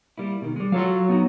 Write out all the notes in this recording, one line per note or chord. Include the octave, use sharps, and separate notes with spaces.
G3 A#3 E4
B2 D#3
G3 G#3
F#3 F4 A4 F5
B3 D#4 F#4